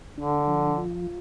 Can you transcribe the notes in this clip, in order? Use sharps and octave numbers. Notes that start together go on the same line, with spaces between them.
D3 D4
F3
F4